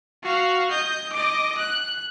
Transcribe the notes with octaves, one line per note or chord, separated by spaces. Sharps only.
F#4 F5
D#5 G6
D#5 D6
F#6